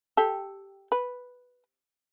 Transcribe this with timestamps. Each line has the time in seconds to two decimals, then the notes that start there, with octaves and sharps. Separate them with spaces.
0.17 G4 A4
0.92 B4